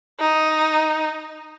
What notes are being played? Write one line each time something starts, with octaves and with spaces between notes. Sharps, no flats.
D#4